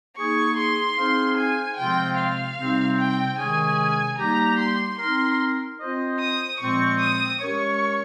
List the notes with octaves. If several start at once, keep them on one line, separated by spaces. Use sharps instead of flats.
A#3 D#4 G#4 C#6
C6
C4 D#4 G#4 C5 F5
G#5
C3 F3 G#3 C4 F4 G5
F5
C3 G3 C4 D#4
G5
C3 D#3 G#3 C#4 G#4 G#5
G3 A#3 D#4 G4 A#5
C6
C4 D#4 A#4 C6
C4 F4 C5 D#5
D#6
A#2 F3 G#3 C4 C#6
D#6
G#3 C#4 G4 A#4 C#5 C#6